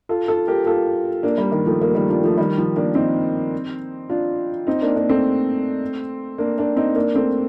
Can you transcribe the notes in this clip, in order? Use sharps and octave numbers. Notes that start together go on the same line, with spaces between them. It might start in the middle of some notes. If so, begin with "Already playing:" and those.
F4 A4
F4 A4
G4 A#4
F4 A4
A#3 D4
G3 A#3
D#3 G3
F3 A3
G3 A#3
D#3 G3
D4 F4
F3 A3
D#3 G3
F3
A#3 D4
C4 D#4
D4 F4
C4 D#4
A#3 D4
A#3 D4
A3 C4
A#3 D4
A#3 D4
C4 D#4
A#3 D4
A3 C4